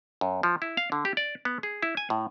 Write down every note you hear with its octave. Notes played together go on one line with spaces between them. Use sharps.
F#2
F3
E4
F5
D3
G4
D5
B3
G#4
E4
G#5
A2